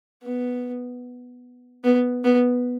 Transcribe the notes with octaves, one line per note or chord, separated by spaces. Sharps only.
B3
B3
B3